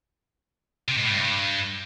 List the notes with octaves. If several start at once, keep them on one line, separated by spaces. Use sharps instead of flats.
C3
G#2
A2
G2